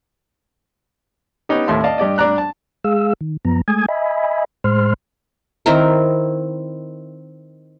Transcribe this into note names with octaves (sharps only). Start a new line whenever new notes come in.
B3 C#4 D#4 G4
D#2 A2 A3 E5 C6
D5 D#5 F5 A5
G2 G4 D5 D#5
G2 G3 D4 D5 A#5 F#6
A5
G#3 G#4 F5 E6
D#3
F#2 F3 B3 A#5
G#3 A3 G#5 D#6 G#6
D#5 E5 G#5 B5
A2 G#3 C5 C6 F6
D#3 C4 E4 A#4